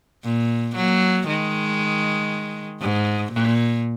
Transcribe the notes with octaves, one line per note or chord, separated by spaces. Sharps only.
A#2
F#3 A#3
D#3 G#3
G#2
A#2